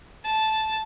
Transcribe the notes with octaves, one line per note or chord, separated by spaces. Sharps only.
A5